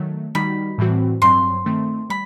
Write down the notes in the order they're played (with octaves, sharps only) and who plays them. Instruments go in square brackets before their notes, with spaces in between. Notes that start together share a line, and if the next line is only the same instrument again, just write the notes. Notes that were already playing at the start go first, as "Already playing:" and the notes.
Already playing: [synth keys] D#3 F#3 A3
[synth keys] D#3 G3 D#4 F#4 [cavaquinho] B5
[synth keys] A2 E3 G3 C4 F#4
[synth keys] G2 F#3 C4 [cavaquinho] C6
[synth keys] D#3 A3 C4
[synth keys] G3 [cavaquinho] B5